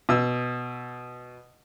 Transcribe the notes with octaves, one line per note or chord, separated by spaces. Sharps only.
B2 E6